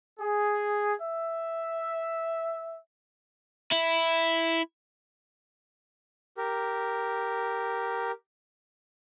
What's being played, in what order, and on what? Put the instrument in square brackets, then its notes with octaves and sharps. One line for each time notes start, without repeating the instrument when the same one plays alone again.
[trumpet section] G#4
E5
[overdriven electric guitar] E4
[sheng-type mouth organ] G4 A#4